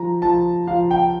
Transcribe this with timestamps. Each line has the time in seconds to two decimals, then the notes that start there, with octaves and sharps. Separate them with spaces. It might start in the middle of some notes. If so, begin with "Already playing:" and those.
Already playing: F3 A#5
0.22 F3 A5
0.68 F3 F5
0.91 G5